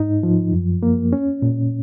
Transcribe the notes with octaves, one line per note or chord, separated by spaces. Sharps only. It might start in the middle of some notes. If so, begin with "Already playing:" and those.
Already playing: G#2 D#4
F3
F#2
A#3
C#4
A#2